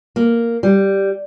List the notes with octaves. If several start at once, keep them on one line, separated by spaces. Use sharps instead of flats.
A#3
G3